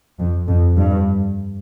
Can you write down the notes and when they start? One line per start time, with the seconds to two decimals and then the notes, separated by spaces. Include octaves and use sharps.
0.19 F2
0.48 F2
0.77 G2